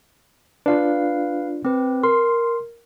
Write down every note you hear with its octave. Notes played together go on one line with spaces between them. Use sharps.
D4 F4 B4 F5
C4 B4
A#4 C6